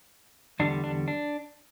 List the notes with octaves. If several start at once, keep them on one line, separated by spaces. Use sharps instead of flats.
E2 D3 G3 D4
D4
D4